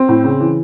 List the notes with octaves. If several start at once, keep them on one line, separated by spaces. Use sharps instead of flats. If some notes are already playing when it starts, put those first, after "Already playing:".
Already playing: C4
A2
C#3
E3